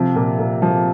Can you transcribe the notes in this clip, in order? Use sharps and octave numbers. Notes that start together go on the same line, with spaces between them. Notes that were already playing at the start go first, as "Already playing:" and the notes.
Already playing: C3 F3
A#2
A#2
F3